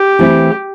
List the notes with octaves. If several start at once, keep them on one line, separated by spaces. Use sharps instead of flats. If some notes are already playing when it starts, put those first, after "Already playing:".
Already playing: G4
E3 A3 C4 E4